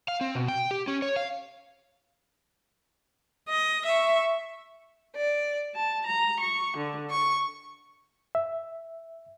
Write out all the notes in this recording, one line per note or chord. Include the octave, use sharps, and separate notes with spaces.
F5
C4
B2
G5
G4
C#4
C#5
F5
D#5
E5 C#6
D5
A5
A#5
C#6
D3
C#6
E5